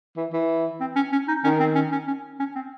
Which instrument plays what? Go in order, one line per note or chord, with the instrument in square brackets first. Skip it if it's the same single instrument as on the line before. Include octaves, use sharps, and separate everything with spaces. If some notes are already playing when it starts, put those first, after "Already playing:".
[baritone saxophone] E3
E3
[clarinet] C4
C#4
C#4
D#4
[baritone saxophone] D#3 [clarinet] C#4
[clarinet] C4
C#4
C#4
C#4
C#4
C4